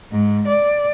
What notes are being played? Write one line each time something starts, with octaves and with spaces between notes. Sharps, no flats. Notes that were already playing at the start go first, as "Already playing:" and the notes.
G#2
D5